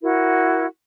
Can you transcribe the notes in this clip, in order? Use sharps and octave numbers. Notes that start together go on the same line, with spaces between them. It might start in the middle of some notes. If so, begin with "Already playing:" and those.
E4 F#4 A#4